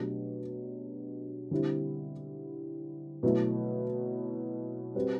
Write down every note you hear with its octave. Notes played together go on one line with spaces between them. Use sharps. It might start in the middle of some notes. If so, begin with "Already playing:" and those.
Already playing: B2 F#3 A3 D4 G4
D3 G3 C4 E4
B2 F#3 A3 E4
G3 C4 F#4 B4